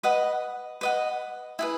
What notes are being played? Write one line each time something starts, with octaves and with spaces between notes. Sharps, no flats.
B4 D#5 F#5
B4 D#5 F#5
E4 G#4 B4